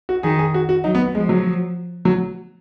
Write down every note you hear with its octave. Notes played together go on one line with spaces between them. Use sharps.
F#4
D#3 G#4
G#4
F#4
F#4
F#3 D#4
B3
F3 G#3
F#3
F#3